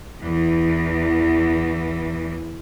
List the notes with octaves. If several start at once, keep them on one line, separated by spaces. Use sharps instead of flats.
E2 E3